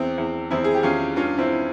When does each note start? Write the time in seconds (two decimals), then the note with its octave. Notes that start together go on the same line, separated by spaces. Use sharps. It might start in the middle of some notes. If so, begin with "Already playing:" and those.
Already playing: E2 C4
0.18 E2
0.51 E2 C4 E4
0.64 G#4
0.74 G4
0.83 E2 C#4 F4
1.16 G2 C#4 F4
1.38 C4 E4